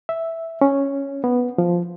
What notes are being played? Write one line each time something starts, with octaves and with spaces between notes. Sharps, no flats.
E5
C#4
B3
F3